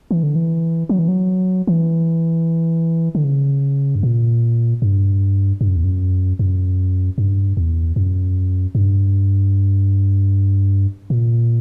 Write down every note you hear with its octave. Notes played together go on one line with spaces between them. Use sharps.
E3
D3
E3
F#3
E3
F#3
E3
D3
C#3
G2
A#2
G2
G2
F#2
E2
F#2
F#2
G2
E2
F#2
G2
A#2